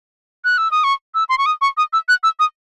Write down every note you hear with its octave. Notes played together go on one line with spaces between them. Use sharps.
F#6
E6
D#6
C#6
E6
C6
C#6
D#6
C#6
D#6
E6
F#6
E6
D#6